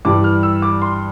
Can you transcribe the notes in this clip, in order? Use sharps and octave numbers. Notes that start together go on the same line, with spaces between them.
G2 E3 G3 D6
F6
E6
D6
C6